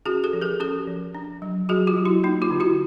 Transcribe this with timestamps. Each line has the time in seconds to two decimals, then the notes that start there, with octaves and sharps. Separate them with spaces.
0.06 C#4 F#4 G#4
0.24 G4 A4
0.33 F3
0.41 G#4 A#4
0.60 C#4 G4 A4
0.87 F3
1.15 D4
1.42 F#3
1.69 F#3 F#4 G#4
1.87 F4 G4
1.97 F#3
2.05 E4 F#4
2.24 A#3 D#4
2.42 F4 G4
2.51 D3
2.60 E4 F#4